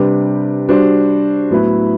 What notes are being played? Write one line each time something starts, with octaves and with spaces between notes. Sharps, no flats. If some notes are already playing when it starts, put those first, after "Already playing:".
Already playing: C3 G3 D4 G4 B4
G3 D4 F#4 C5
A2 F#3 B3 E4 B4